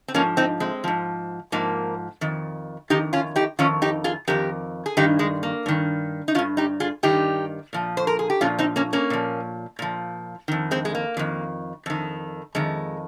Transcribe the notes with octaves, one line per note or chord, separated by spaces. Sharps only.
C4
G#2 F3 A#3 C#4
C4 D#4
G#3 C4
G#2 F3
G#2 F3 A#3
F2 D#3
F2 D#3 D#4 G4
C#4 F4
D#4 G4
F2 D#3 C#4 F4
D#4 G4
F4 G#4
F2 D#3 G4 A#4
G#4
G2 D#3 D#4 G4
G#3
A#3
G2 D#3
D#4
D#3 C#4 F4
G2
D#4 G4
F4 G#4
G2 D#3 D#4 G4
A#2 F3
C5
A#4
G#4
G4
A#2 F3 C#4 F4
C4 D#4
A#3 C#4
A#3 C#4
A#2 F3
A#2 F3
F2 D#3
G#3 C4
G#3
A#3
F2 D#3
F2 D#3
F2 D#3 G#3